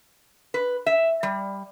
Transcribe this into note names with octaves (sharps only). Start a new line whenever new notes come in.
B4
E5
G3